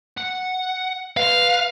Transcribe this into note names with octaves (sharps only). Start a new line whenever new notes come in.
F#5
B4 F5 C6